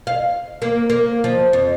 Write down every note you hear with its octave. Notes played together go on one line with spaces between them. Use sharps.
F5
A#3
A#3
F3
F2